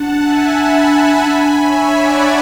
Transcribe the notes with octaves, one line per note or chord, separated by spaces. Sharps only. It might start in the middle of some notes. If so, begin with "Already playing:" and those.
Already playing: D4 F#5 A5
E5 G#5
G#5 B5
D4 G#5 B5
C#5 E5
D5 F#5